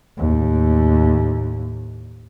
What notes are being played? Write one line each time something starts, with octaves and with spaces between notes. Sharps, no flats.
D#2 A2